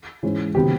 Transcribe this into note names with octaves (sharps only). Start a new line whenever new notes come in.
G#2 E3 G#3 C#4
C3 D#3 F#3 B3 G4